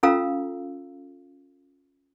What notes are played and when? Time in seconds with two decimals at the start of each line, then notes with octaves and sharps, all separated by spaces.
0.03 C#4 F4 A4 F5 A#5 E6